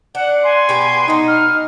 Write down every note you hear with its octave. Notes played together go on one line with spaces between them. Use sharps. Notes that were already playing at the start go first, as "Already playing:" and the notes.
D4 F#5
G#5 C6
B2 G4 B4
B2 D#4 D#5
F6